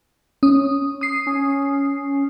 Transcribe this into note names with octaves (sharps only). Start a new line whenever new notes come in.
C#4 D#6
D#6 C7
C#4